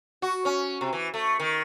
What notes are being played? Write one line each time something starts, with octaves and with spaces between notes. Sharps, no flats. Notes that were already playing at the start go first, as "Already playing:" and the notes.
F#4
C#4
C3
E3
A3
D#3